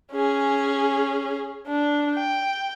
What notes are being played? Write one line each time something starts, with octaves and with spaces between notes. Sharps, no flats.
C#4 G#4
D4
G5